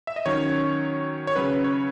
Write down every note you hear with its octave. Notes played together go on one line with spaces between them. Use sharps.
E5
D#5
D#3 F#3 C#4 C#5
C#5
C#3 F#3 C#4 B4
C#5